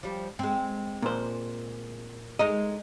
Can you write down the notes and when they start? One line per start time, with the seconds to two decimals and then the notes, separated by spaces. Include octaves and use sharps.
0.03 F3 G3
0.39 G#3 C4
1.02 A#2 C5
2.39 G#3 D#4 A#4 D#5